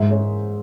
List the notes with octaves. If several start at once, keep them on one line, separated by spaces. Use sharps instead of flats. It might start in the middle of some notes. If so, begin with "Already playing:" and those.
Already playing: G#2 E5
G#3 C#5